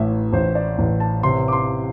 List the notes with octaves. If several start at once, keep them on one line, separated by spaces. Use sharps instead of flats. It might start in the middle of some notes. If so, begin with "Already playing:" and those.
Already playing: A1 A2 E5
A1 C5
D5
A1
A5
C3 C6
D6
C6